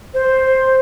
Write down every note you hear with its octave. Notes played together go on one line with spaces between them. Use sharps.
C5